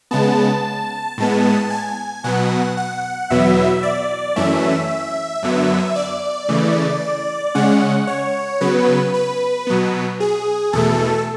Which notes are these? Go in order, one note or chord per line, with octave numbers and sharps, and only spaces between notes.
C#3 G#3 B3 A5
A2 G#3 B3
G#5
B2 F#3 B3 F#5
F#5
E2 B2 F#3 B3 E5
D5
F#2 E3 A3 C#4 E5
F#2 D3 F#3 B3
D5
C#3 E3 A3
C#3 G#3 C#4 F#5
C#5
C#3 F#3 B3 B4
B4
B2 F#3 B3
G#4
E2 B2 A3 A4